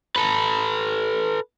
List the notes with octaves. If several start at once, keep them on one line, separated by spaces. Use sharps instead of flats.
A4 B4